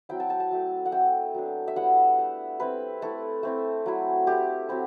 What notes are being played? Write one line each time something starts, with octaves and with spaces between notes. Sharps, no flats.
F#3 C4 E4 G5
A5
A5
A5
F#3 A3 E4
F#5
A3 C4 E4 G5
F#3 B3 D4
E5
G3 B3 E4 F#5
A3 D4
G3 C4 E4 B4
A3 E4 A4
A3 C4 E4
F#3 A3 E4
A3 E4 G4
F#3 C4 E4